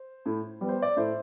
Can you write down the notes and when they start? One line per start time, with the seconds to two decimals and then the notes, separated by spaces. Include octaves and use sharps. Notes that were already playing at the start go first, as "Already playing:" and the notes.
Already playing: C5
0.26 A2
0.61 G3 B3
0.68 C5
0.82 D5
0.96 A2 C5 E5